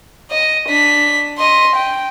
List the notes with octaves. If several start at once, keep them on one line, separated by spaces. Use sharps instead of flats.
D#5
D4 B6
D#5 C6
G5